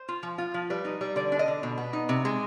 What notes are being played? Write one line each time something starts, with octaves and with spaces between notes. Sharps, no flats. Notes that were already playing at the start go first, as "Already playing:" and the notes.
Already playing: C5
F4
F3
F4
F3
G3 B4
D#4
G3
D3 D5
D4
D#5
D3
B2
B3
D#4
C3
G#3